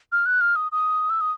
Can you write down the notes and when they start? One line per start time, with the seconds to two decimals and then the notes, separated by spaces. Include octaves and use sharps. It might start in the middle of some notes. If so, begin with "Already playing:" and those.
0.12 F6
0.26 F#6
0.41 F6
0.56 D#6
0.72 D#6
1.10 E6
1.21 D#6